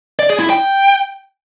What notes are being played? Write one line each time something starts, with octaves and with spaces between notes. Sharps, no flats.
D5
G#4
E4
G5